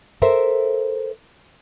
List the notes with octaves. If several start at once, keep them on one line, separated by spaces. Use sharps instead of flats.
A4 A#4 C5 E5